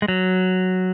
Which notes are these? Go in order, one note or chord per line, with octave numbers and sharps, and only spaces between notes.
G#3
F#3